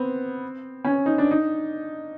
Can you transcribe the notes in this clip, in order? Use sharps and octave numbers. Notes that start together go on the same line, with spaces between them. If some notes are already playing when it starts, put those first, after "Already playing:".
Already playing: B3 C4
C#4
D#4
D4
D#4